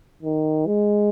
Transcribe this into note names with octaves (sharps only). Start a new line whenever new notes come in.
D#3
G#3